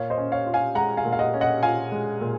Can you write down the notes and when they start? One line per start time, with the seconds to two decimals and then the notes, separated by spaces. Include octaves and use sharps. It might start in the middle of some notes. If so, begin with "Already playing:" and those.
Already playing: A#2 C#5 F5
0.10 C5 D#5
0.18 C#4
0.32 C#5 F5
0.46 F4
0.54 F5 G#5
0.75 G#3 F#5 A#5
0.97 F5 G#5
1.05 A#2
1.13 F5
1.19 D#5 F#5
1.34 C#4
1.41 D#5 F#5
1.63 F4 F5 G#5
1.92 G#3
2.21 A#2